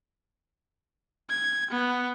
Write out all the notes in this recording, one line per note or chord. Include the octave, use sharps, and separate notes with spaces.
G#6
B3